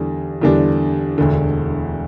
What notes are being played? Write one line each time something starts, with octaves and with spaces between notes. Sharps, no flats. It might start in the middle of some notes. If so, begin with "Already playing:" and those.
Already playing: E2 D3 G3 D4
E2 D3 G3 D4
E1 D2 D3